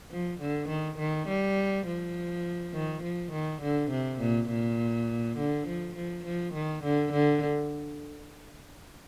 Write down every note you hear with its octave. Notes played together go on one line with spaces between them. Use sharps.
F3
D3
D#3
D#3
G3
F3
D#3
F3
D#3
D3
C3
A#2
A#2
D3
F3
F3
F3
D#3
D3
D3